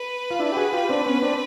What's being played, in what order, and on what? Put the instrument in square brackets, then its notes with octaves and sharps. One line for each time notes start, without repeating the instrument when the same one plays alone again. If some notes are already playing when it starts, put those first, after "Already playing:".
Already playing: [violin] B4
[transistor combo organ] F4
D4 E4
G4
F#4 G#4
F4 G4
C4 D4
B3 C#4
C4 D4